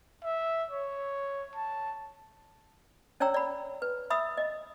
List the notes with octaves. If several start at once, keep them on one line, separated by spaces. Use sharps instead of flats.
E5
C#5
A5
C#4 C#5 D5 G5 A#5 E6
D5 B5
B4
E5 B5 D#6 E6
D#5